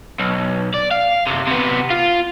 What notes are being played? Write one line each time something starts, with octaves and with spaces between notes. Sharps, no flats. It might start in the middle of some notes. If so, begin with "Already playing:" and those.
B1
D5
F5
F#2 C3
C3 B3
F4